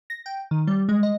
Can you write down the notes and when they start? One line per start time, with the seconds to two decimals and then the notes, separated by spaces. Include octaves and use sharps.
0.10 A#6
0.26 G5
0.51 D#3
0.67 G3
0.89 G#3
1.03 D#5